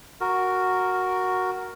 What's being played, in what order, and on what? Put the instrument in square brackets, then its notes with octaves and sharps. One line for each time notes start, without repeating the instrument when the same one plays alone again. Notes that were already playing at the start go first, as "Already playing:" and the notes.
[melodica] F#4 A#4